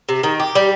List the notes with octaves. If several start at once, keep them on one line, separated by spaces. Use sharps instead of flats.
C3
D#3
G4
G3